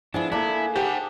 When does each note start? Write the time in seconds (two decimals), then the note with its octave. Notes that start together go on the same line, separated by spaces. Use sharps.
0.14 F3 B3 D4 E4 G#4
0.32 A3 A#3 D4 E4 G#4
0.76 G4 C5 F#5